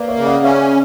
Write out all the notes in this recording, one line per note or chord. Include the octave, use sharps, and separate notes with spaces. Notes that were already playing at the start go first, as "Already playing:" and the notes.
Already playing: A#3 B4 D5
C#5 E5
C#3
D5 F#5
C#4 C#5 E5